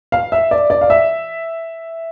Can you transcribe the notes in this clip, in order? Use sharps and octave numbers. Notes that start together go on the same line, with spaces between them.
F5
E5
D5
D5
F5
E5